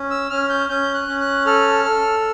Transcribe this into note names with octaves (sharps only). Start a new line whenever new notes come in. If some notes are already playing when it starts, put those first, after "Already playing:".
Already playing: C#4
E6
C#4 F6
G6
C#4 G6
F#6
C#4
F#6
A4 F6
A4